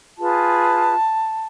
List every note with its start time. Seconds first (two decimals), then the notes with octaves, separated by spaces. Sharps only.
0.19 F4 G#4 B4 A5